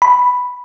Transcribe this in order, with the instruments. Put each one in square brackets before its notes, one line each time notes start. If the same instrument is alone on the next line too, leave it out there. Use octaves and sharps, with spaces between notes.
[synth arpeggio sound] B5